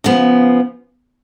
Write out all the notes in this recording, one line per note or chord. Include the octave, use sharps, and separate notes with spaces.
C#3 F3 B3